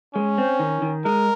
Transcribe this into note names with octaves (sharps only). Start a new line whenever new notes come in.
G#3 C#4
C4
D#3
D#3
G#3 A#4